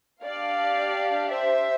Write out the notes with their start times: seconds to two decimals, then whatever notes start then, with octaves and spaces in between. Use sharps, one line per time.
0.23 D4 G4 D5 F5
1.30 C5 E5